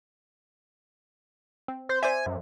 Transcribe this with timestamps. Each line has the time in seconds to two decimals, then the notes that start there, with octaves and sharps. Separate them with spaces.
1.68 C4
1.89 C5
2.03 C5 D5 E5 G#5
2.26 F#2